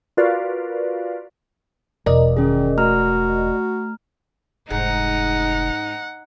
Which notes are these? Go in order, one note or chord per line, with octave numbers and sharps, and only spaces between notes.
F4 F#4 A#4 B4 D5 F5
E1 A#4 D5 D#5
D#3 C#4 G#4
A3 F#4 A#5 F6
F1 G#2 D#4 F#5